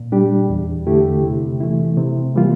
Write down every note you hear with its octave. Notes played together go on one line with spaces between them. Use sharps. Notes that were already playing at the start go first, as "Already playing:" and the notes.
Already playing: A#2
G3 D4 G4
E2
D3 A3 E4 G4
C3
E3 A3 E4
C3
E3 G3 A#3 F4